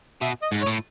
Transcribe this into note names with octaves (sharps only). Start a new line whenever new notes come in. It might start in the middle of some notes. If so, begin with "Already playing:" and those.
B2 E5
D#5
G#2
C#5
A2